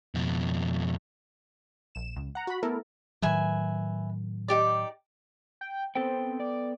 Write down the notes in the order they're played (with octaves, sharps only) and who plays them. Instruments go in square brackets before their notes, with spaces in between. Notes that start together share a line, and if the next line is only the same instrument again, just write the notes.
[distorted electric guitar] F2 B2
[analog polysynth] A#1 E7
C#2
F#5 A#5
F#4 B5
A3 B3 E4 A4 A#4
[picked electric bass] A2 D#3 F#3 [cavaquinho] B4 E5 G#5
[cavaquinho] D#4 G4 D5
[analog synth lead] G5
[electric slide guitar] B3 A4 G5 [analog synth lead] C4
[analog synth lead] D5